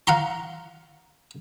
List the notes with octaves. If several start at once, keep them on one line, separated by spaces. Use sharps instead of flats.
F5 F#5 A#5 C6